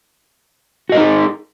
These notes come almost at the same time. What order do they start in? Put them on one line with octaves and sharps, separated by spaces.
F#4 D#5 A#4 D#4 G#4